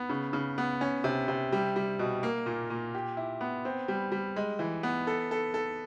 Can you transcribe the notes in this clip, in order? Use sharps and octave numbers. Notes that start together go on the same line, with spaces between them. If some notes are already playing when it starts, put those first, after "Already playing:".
Already playing: B3
C#3
C#3
B3
C#4
C3
C3
G3
G3
B2
A#3
A#2
A#2
G4
E4
B3
C4
G3
G3
G#3
E3
B3
A4
A4
A4